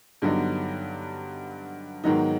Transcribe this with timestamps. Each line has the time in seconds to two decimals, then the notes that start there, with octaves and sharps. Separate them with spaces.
0.22 G2 D3 F#3 B3 D#4
2.04 G#2 D#3 F#3 B3 D#4